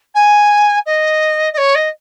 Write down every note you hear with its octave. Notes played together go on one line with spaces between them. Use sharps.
G#5
D#5
D#5
C#5
D#5